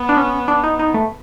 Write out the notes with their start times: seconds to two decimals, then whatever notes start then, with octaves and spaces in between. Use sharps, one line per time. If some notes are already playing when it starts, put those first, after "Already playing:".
Already playing: B3
0.09 D4
0.17 C#4
0.48 D4
0.64 D#4
0.79 D#4
0.94 A3